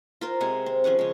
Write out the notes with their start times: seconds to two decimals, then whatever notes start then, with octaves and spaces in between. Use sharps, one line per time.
0.21 F4 A#4 C5
0.41 C3 G#3 F#5 G#5
0.66 C4
0.84 F3 C#4 G#4 F#5
0.99 C#3 G#3